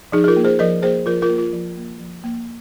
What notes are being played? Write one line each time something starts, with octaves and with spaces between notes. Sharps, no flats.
F3 D#4 G#4
G#4
F4 A#4
A#3
G#4 C5
F3 A#4 D#5
A#3 G#4 C5
F3 F4 A#4
F4 A#4
A#3
F4
F3
A#3
F3
A#3